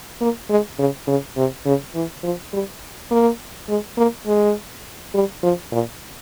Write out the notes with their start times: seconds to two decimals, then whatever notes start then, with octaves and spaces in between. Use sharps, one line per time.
0.21 A#3
0.50 G#3
0.79 C#3
1.08 C#3
1.37 C3
1.65 C#3
1.95 E3
2.23 F3
2.53 G3
3.11 A#3
3.69 G#3
3.97 A#3
4.27 G#3
5.14 G3
5.43 F3
5.72 A#2